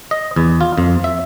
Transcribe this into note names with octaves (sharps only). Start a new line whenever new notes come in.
D#5
E2
F4
F2
E5